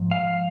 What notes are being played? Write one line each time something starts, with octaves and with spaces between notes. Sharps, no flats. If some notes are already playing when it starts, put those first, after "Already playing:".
Already playing: G#2 F3
F5